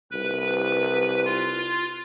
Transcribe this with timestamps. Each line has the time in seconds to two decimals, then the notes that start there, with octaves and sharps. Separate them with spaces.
0.11 C2 B4
1.25 F4